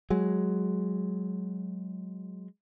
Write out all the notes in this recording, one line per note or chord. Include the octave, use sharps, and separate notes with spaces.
F#3 G#3